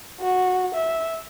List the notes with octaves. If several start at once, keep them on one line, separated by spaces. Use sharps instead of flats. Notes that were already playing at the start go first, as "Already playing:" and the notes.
F#4
E5